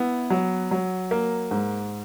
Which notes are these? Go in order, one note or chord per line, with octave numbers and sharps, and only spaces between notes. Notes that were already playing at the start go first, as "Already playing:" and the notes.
Already playing: B3 E4
F#3
F#3
A#3
G#2